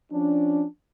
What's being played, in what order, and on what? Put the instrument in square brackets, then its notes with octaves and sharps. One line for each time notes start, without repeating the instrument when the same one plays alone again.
[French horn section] F3 C#4 D4